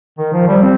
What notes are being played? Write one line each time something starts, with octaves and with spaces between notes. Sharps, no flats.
D#3
F3
G3
C4